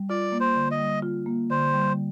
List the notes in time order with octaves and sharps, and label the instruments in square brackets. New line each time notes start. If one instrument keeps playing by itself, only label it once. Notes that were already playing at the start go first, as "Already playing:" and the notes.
Already playing: [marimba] G3
[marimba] F4 [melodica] D5
[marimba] A#3
[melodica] C5
[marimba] D3
[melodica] D#5
[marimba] G3
F4
A#3
[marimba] D3 [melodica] C5
[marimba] G3